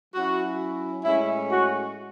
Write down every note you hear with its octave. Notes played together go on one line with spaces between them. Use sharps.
F#3 C#4 E4 F#4
A2 G#3 C#4 E4
F#4